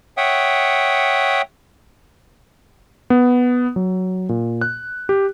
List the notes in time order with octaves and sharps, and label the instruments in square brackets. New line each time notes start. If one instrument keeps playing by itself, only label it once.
[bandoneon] C#5 E5 F#5 G5 D#6
[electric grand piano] B3
F#3
A#2
F#6
G4